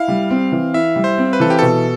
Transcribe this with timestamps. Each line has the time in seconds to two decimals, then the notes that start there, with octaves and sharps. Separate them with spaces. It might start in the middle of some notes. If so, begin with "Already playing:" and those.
Already playing: E4 F5
0.08 G3
0.30 C4
0.52 E3
0.74 E4 E5
0.96 G3
1.04 C5
1.18 C4
1.33 B4
1.40 E3 A4
1.50 G4
1.59 B2 A4